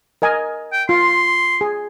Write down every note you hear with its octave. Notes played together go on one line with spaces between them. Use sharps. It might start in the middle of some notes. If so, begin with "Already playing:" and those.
A#4 D#5 G#5
G5
F4 C6
G#4